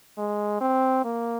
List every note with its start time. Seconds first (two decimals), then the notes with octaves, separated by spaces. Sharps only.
0.18 G#3
0.61 C4
1.04 A#3